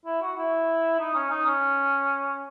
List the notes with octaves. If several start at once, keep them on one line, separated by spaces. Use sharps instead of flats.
E4
F#4
E4
D#4
C#4
D#4
C#4